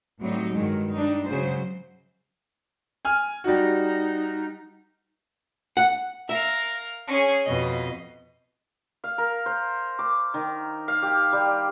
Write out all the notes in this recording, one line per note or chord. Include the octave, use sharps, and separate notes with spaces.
A2 F#3 G3 C4 D#4
G2 D#3 F#3 G#3
G3 D4 D#4
C#3 F#3 G#3 C5
G#5 F6
G3 D#4 F#4
F#5
A#4 E5 F5
C#4 G#4
F2 B2 D#5
F5
A#4
C5
D6
D#3
F5
G4
G3